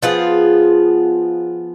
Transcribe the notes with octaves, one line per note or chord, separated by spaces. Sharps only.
F3 B3 F4 G#4